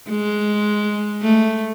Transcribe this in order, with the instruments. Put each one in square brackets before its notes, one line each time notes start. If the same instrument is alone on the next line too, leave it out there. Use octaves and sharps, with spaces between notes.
[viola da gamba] G#3
A3